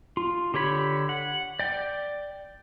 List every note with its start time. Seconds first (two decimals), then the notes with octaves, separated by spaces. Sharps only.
0.17 F4
0.54 D3 G4 C#5 B5
1.09 F#5
1.59 D5 G5